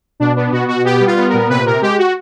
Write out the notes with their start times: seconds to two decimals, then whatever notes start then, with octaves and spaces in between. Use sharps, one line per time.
0.20 B2 D4
0.36 B3 D4
0.52 B2 F#4
0.68 B2 F#4
0.85 B3 G4
1.00 G3
1.07 F4
1.17 B3
1.28 A#4
1.33 A#2
1.49 C3 B4
1.65 C3 A#4
1.82 G#3 G4
1.98 F#4